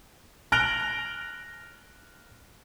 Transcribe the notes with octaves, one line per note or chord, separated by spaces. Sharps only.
F6 F#6 A#6 D7 F7 G7